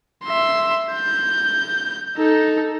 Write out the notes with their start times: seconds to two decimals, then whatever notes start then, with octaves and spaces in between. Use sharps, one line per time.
0.25 E5 C6
0.93 G6
2.17 D#4 A4